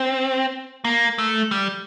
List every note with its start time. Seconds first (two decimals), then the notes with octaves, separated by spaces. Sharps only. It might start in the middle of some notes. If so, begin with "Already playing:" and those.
Already playing: C4
0.85 A#3
1.18 A3
1.51 G3